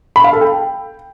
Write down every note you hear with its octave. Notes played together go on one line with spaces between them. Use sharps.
B5
F5
A4
G5